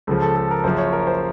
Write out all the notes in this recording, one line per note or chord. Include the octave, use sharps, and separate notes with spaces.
C#2 C#3 F3 A4
A4
A4
A#4
F#1 F#2 F3 C5
C#5
A#4
C5